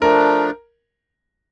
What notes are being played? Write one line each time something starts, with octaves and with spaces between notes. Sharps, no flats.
F3 A3 D4 A#4